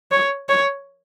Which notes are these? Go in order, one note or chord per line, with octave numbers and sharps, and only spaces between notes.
C#5
C#5